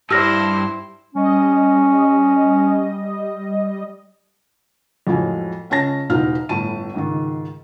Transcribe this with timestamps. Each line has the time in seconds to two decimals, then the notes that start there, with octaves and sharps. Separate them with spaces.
0.11 G2 E4 G4 C5 D5 E6 F6 A#6
1.15 G3 C#4 D#5
5.07 F2 A2 F#3 G#3 F4 G#5
5.70 C#2 C#4 A5 A#6
6.10 E1 B2 E3 D#4 F4 F6
6.49 G1 A2 E4 A5 D#7
6.94 C#2 G#2 D#3